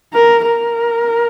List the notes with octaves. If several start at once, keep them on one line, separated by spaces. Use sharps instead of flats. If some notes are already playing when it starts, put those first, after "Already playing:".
A#4
A#4